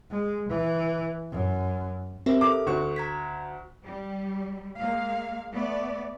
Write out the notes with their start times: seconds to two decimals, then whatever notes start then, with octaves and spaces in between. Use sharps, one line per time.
0.11 G#3
0.49 E3
1.31 F#2
2.26 C4 G4 A#4 E5
2.41 A4 B4 D6
2.66 D2 F#4 C#6
2.96 A#5 G#6 B6
3.84 G3
4.78 G#3 A#3 F5
5.52 A3 B3 D5